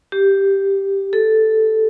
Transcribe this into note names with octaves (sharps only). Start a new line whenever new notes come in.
G4
A4